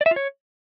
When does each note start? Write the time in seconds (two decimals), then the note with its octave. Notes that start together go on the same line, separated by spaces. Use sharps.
0.01 D5
0.06 E5
0.11 F4
0.16 C#5